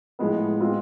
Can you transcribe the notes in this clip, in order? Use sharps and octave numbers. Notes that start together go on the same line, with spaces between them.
A2 F3 G#3 B3
G#3 C4 F4